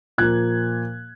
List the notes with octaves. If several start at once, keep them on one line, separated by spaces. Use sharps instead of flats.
A#2 F3 A#3 F#6 G#6